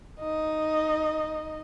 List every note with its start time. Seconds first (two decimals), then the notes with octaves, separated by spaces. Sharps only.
0.20 D#4 D#5